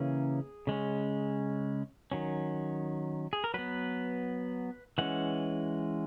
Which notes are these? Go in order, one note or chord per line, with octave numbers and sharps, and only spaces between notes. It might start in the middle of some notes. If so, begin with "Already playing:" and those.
Already playing: C#3 E3 A#3 C#4 G#4
C#3 G#3 C#4
D#3 F#3 C#4
G#4
A#4
F#3 B3 B4
E3 G#3 C#4 F#5